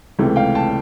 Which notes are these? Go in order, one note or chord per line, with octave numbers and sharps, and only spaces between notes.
C#2 C3 E3 A3
F5 G5
G5 A5